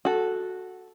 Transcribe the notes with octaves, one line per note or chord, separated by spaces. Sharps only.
F#4 A4